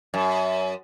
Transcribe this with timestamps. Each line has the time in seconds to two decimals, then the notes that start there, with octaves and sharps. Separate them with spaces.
0.14 F#2